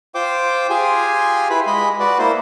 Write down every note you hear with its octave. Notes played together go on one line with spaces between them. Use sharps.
F4 C5 G5 D6
F4 G4 G#4 G#5
E4 B4 B5
G#3 D#5 B5
F#4 B4 D5
A#3 E4 C5